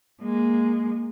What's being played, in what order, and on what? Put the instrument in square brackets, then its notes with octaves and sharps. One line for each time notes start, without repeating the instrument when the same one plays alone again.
[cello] G#3 A#3